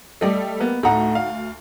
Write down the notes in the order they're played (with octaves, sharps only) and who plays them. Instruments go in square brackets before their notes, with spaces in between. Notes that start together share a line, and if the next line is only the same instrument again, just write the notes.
[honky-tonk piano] G3 A3 [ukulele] G4 D5 D#5
[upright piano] A#3 B3
[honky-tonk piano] D2 [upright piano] A2 A#5 [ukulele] D#4 F#5
[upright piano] F5